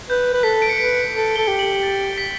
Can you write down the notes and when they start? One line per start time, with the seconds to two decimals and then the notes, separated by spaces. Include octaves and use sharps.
0.10 B4 G6
0.34 B4
0.43 A4 B6
0.62 D7
0.69 C#7
0.78 B4 B6
1.13 A4 B6
1.36 A4 G7
1.48 G4
1.59 F#7
1.83 A6
2.18 B6